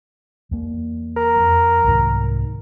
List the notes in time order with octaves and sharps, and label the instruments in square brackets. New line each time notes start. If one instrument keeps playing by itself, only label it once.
[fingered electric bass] E2 A#3
[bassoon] A#4
[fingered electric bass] F2
C2 G#2 D#3